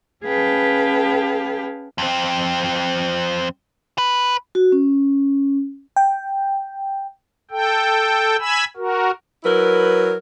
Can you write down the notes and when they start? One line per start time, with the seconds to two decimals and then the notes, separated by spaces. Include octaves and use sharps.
0.25 C#4 G#4 B4 F5 G5 A5
1.98 F2 C4
3.98 B4
4.55 F#4
4.72 C#4
5.96 G5
7.51 A4 G5
8.40 G#5 B5 E6
8.77 F#4 A#4
9.44 F#3 E4 A#4 B4